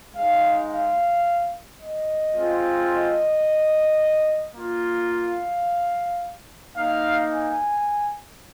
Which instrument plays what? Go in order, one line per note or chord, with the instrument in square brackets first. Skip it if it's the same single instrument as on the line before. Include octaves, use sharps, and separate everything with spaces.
[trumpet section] G#3 D#4 F5
F5
D#5
G#3 C4 F4
D#5
A#3 F4
F5
A#3 D#4 F5
G#5